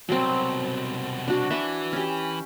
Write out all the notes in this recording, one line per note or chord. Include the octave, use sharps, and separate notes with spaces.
C2 B2 F#3 C4
D4 F#4
E3 E5 F#5
C#4 G4